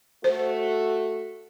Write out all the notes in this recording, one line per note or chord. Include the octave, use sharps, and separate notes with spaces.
A3 F#4 C5